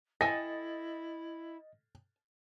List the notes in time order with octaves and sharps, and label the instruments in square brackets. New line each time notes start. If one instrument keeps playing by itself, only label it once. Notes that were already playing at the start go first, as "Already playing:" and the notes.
[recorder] E4 [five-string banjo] A4 G5 G#5 [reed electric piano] D#5 A6 [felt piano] A#6